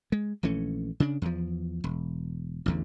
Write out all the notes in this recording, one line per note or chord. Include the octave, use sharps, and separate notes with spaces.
G#3
A#1 E3 A3 C#4
C#3 D4
E2 F3
E1
A1 E2 D3